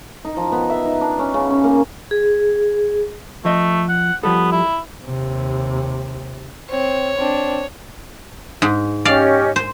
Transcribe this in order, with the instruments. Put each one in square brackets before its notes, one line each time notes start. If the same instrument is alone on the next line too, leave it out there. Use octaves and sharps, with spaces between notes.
[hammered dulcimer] D#4
F3
B3
E5
D#4
D4
C#4
C#3
C#4
A#3
[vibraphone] G#4
[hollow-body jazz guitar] F3 D#5 [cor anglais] A3
[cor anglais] F#5
[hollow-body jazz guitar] F3 G3 A4 [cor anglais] B3
[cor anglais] E4
[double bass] D#2 C3
[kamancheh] C4 [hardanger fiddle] C#5
[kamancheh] C4 D4
[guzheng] G#2
[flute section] C#4 G4 D#5 [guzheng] D5 F5
[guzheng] C5